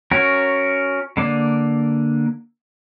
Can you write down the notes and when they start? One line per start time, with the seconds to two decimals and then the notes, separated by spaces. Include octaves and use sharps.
0.11 C#4 F#4 A#4
1.17 D3 A#3 D5